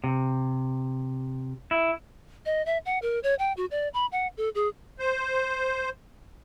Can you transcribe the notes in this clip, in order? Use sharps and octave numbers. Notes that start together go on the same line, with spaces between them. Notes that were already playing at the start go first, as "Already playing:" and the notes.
C3
E4
D#5
E5
F#5
A#4
C#5
G5
F#4
D5
B5
F#5
A4
G#4
C5